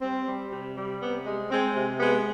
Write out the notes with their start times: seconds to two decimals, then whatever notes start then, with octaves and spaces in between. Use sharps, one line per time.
0.01 G3 C4
0.25 G3
0.51 C3
0.76 G3
1.00 C3 B3
1.25 G#3
1.50 G#3 C4
1.75 C3
2.00 G#3 B3